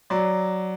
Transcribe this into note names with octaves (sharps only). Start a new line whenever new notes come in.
F#3 D5